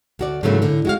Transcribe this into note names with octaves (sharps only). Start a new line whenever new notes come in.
D2 F#4 D5
G#2 C#3 E3 F#3 A3 A#3
A2 D3
G#3 F#4 F5